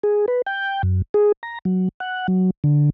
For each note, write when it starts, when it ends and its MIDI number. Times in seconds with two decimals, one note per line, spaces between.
0.03 0.26 68
0.28 0.42 71
0.46 0.82 79
0.83 1.02 42
1.14 1.32 68
1.43 1.59 82
1.65 1.89 54
2.00 2.27 78
2.28 2.50 54
2.64 2.90 50